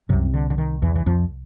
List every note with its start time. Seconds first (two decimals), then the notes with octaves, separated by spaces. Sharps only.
0.09 C2 F#2 C3 F#3
0.34 D3
0.50 D3
0.58 D#3
0.82 E2 E3
0.96 E3
1.06 F2 F3